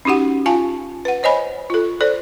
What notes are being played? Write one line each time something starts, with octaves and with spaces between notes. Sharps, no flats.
C#4 D#4 F#4 G4 F#5
F4 F5 G#5 A5
B4 F#5
C5 C#5 D#5 G#5 B5
F4 A4
A4 C5 D5